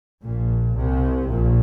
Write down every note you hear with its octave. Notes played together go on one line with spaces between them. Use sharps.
A#1 A#2
C2 C3
A#1 A#2